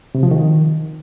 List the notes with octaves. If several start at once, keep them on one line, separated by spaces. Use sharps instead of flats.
C3
F3
D#3